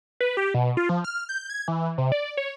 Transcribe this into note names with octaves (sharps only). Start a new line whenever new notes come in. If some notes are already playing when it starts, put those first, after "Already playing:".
B4
G4
B2
F4
F3
F6
G6
G#6
E3
C3
D5
C#5